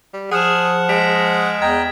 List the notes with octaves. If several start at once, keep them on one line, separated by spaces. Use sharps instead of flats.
G3
F3 G#4 F#5 D#6 F6 E7
G#3 B6 D7
E2 D#5 G5 A#5 G#6